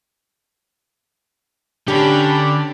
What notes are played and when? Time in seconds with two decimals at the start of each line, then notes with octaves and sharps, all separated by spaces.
1.88 D3 C#4 D4 G4 B5